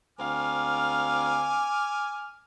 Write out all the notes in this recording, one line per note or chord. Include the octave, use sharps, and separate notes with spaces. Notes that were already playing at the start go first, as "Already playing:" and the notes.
D2 C4 F5 G#5 D6 F6